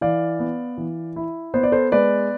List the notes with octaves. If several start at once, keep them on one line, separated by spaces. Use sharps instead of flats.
E3 D5 F5
B3
E3
E4
B3 C5
D5
A4 C5
G#3 B4 D5